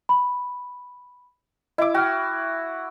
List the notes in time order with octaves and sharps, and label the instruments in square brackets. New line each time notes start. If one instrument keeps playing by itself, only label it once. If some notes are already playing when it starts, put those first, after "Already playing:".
[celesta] B5
[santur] E4 D6 [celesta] D#5 E6
[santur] F#4 [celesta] G5 F6